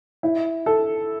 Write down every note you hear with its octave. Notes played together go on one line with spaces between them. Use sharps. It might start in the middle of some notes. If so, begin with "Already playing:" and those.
E4
A4